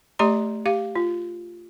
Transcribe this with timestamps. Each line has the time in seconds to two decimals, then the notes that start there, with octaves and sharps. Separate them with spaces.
0.19 A3 G4 D5 A#5 C6
0.66 G4 F5
0.96 F4